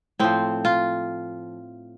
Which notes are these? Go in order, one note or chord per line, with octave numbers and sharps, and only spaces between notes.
A2 F3 C4
F4